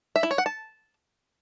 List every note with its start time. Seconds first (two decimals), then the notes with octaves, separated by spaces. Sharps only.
0.16 E5
0.23 E4
0.31 C#5
0.38 F#5
0.46 A5